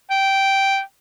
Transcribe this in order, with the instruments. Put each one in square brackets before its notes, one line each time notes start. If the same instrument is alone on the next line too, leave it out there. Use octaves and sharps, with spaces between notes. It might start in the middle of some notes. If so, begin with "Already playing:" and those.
[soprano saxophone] G5